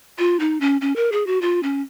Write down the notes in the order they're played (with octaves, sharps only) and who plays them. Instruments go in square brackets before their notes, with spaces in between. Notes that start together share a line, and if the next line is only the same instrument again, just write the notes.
[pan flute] F4
D#4
C#4
C#4
A#4
G#4
F#4
F4
C#4